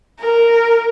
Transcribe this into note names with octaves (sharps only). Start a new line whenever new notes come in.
A#4